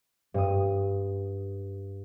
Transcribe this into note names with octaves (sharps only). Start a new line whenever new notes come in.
G2 D#6